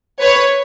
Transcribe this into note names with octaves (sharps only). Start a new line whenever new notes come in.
B4 C#5